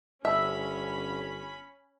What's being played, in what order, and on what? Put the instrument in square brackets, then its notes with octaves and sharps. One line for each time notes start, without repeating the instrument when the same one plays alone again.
[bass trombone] G1 [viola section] C#4 B5 [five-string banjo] E5